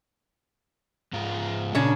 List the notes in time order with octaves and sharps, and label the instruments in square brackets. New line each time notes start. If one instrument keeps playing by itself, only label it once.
[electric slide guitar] G#2 G#3 F4
[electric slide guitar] A#2 [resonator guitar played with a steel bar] C#3 C#4 D4